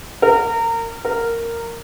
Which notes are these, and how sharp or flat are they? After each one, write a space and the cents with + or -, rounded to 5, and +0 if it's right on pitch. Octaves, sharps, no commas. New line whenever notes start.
A#4 -25
A#4 -10